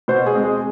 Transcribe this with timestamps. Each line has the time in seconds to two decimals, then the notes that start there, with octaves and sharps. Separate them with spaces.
0.08 B2 C5
0.26 G#4
0.35 G#3 C4
0.44 G#4